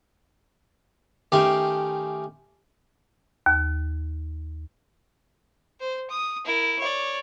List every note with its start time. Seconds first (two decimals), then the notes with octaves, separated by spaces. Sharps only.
1.32 D#3 A3 C#4 G4 C6 D6
3.46 D#2
5.80 C5
6.10 D#6
6.45 E4 A#4
6.79 C#5 D5